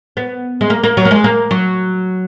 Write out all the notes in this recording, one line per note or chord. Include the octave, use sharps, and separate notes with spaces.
B3
G#3
A#3
A#3
F#3
A#3
G#3
A#3
F#3